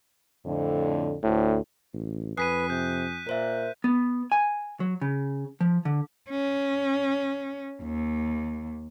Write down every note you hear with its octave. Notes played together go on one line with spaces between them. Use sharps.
F2 A2 D3
D2 A2
A1
F2 B4 G#5 D#6 F#6 B6 C7 D#7
C3 G6
A#2 A#4 C5 E5
B3
G#5
F#3
C#3
F3
D3
C#4
D#2